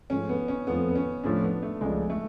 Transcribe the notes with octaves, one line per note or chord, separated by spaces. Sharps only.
G#2 F3 A3 C#4 F4
B3
C#4
F2 F3 A3 B3
B3
C#4
A2 F3 A3 C#4 D4
B3
A3
C#2 C#3 F3 G#3 A3 D4
A3